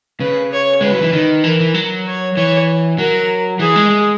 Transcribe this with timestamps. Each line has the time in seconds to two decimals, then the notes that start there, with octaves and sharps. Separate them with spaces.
0.20 C#3 B4
0.52 C#5
0.81 G#3 B4
0.92 F#3
1.02 E3
1.13 D#3
1.44 E3 A#4
1.60 E3
1.74 F#3
2.06 C#5
2.36 E3 C#5
2.98 F#3 A#4
3.59 E3 G#4
3.76 G#3
3.90 G#3